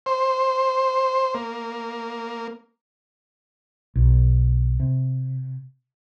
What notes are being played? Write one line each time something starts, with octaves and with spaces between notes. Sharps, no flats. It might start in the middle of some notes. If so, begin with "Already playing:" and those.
C5
A#3
B1
C3